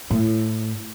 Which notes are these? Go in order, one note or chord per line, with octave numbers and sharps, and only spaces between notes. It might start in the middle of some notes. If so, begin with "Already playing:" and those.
A2